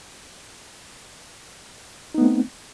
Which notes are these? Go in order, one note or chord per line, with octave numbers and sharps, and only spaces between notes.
A3 B3 C4 D#4